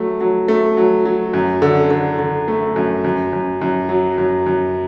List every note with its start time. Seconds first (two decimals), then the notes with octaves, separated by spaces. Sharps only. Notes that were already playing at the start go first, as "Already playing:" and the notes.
Already playing: F#3 A3
0.21 F#3
0.48 A3
0.77 F#3
1.05 F#3
1.33 F#2
1.62 D3
1.91 D3
2.19 D3
2.48 A3
2.76 F#2
3.04 F#2
3.33 F#2
3.61 F#2
3.89 F#3
4.18 F#2
4.46 F#2